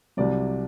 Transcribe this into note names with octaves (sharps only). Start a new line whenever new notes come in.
C2 C3 F#3 D5